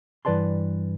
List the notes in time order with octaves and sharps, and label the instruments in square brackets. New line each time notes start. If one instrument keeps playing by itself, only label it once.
[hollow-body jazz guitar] G2 E3 B4 D5 A5 C6